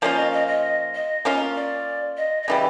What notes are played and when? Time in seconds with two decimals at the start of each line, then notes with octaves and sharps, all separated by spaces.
0.02 F3 A#3 C#4 F4 D5
0.17 D#5
0.33 D#5
0.48 D#5
0.95 D#5
1.25 A#3 C#4 F4
1.56 D5
2.17 D#5
2.43 D#5
2.48 C#3 E3 G3 D5